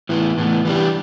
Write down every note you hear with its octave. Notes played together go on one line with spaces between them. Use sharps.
A2 E3 B3
A2 E3 B3
E3 G3 D4 G4